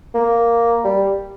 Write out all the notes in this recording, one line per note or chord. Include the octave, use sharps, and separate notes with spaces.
A#3
G3